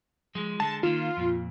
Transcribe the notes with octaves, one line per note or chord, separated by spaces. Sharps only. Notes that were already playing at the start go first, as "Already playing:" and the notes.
F3 G#3
D3 G#3 A5
D#3 A#3 F4
F2 A#2